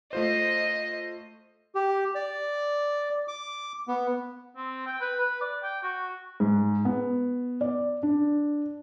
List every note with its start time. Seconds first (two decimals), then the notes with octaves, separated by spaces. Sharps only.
0.13 A3 F4 C5 D#5
1.75 G4
2.15 D5
3.28 D6
3.88 B3
4.56 C4
4.86 G5
5.01 B4
5.20 B4
5.41 D5
5.63 G5
5.83 F#4
6.40 G#2
6.85 B3
7.61 D5
8.03 D4